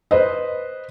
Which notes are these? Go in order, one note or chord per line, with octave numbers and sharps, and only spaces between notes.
B4 C5 D#5